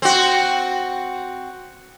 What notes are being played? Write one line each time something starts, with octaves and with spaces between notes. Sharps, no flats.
C4 F#4